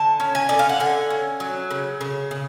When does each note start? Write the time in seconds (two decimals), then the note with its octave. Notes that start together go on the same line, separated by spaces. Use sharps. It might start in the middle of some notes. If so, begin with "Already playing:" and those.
Already playing: D3 A5
0.20 C#4
0.35 G#5
0.49 D3 D5
0.59 F5
0.69 F#5
0.80 D3 G#5
1.10 C#4
1.40 F#3
1.71 C#3
2.01 C#3
2.31 C#3